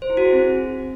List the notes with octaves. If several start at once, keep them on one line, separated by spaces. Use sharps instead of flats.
C5
E4
F#4
G#4
C4